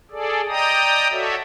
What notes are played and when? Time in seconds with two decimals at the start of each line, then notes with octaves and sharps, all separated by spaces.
0.11 G#4 A4 D5
0.49 D5 D#5 G5 A#5 D#6
1.11 F#4 A4 C#5 D5 E5